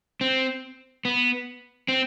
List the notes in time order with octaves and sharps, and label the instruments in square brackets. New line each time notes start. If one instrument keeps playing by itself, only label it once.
[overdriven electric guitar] C4
B3
C4